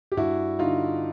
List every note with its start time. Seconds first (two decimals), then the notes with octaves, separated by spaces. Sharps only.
0.12 G4
0.17 G2 E4 F#4
0.59 D3 D#4 F4